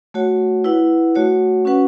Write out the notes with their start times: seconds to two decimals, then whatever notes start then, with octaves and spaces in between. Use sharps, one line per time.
0.14 A3 F#4 C#5 F#5
0.64 E4 B4 F#5
1.15 A3 F#4 C#5 F#5
1.65 C#4 F#4 B4 F#5